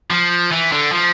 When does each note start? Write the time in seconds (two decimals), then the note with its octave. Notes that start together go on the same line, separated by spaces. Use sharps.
0.11 F3
0.52 E3
0.72 D3
0.92 F3